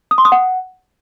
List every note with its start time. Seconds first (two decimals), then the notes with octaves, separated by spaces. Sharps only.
0.11 D#6
0.18 C6
0.25 D#6
0.32 F#5